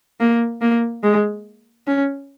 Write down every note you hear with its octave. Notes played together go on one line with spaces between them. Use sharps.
A#3
A#3
G#3
C#4